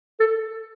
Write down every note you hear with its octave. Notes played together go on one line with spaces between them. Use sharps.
A4